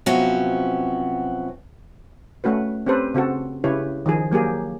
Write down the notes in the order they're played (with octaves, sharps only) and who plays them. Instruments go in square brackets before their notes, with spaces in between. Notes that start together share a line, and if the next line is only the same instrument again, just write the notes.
[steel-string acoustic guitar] C3 F3 F#3 B3 C#4 F#4
[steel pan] A3 C#4 F#4 B4
C4 C#4 G4 A4 B4 C5
C#3 C4 F#4 A4
C#3 E4 G4 B4 C#5
D#3 F3 G#4
F#3 A#3 G4 G#4